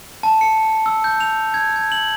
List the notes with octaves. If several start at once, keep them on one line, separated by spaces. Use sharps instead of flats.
A5
C#7
E6
G6
F7
G#6
G#6
F#7